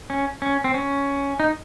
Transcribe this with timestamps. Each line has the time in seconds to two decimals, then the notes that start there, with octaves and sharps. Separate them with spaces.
0.10 C#4
0.42 C#4
0.64 C4
0.74 C#4
1.40 D#4